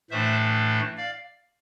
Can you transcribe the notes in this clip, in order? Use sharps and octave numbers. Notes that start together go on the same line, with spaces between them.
A2 E3 A3 D4 C5 E5
D5 F5